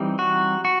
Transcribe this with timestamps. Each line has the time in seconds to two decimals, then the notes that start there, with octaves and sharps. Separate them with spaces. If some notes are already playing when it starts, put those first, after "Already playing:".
Already playing: E3 G3 C4 D#4
0.19 F#4
0.65 F#4